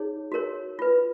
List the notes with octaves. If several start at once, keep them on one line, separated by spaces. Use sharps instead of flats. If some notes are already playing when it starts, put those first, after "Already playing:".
Already playing: D#4 G#4 C#5
F#4 A#4 C#5
F4 B4